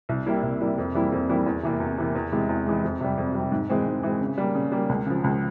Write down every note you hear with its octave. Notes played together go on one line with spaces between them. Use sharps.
C2
C3 G3 A#3 E4
C2
C3 G3 A#3 E4
F2
E3 G3 A#3 E4
F2
E3 G3 A#3 E4
E2
C3 E3 A#3
E2
C3 E3 A#3
E2
C3 E3 G#3
E2
C3 E3 G#3
F2
C3 G3
F2
G3
C3
G#2
E3 G#3 C4
G#2
E3 G#3 C4
C#3
G3 A#3
C#3
G3 A#3
C#2
C#3 F3
C#2